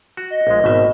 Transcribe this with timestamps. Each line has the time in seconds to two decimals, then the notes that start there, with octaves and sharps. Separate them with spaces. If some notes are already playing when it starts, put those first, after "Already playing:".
0.17 F#4
0.30 D#5
0.47 A#1 G#3
0.64 G#1 B2 E5